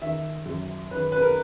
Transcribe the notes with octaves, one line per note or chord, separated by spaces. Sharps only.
D#3 E5
F#2
D#3 B4
B4
A#4